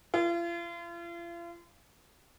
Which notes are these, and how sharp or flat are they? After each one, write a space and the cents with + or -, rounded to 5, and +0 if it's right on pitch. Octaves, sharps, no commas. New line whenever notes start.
F4 -40